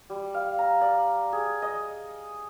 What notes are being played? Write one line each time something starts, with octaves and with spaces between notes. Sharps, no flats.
G3
F5
A#5
D5
G#4
D#5